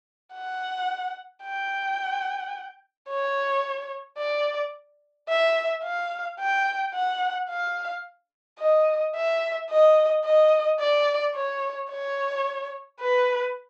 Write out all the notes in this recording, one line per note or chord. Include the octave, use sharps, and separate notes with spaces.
F#5
G5
C#5
D5
E5
F5
G5
F#5
F5
D#5
E5
D#5
D#5
D5
C#5
C#5
B4